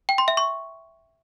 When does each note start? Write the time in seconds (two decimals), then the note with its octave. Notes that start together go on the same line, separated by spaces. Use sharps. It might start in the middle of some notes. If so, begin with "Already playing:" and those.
0.09 G5
0.18 C6
0.28 E5
0.37 C#6